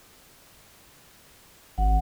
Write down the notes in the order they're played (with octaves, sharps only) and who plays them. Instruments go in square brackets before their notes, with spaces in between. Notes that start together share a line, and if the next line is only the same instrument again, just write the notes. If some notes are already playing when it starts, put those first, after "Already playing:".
[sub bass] G#1 [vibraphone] F#5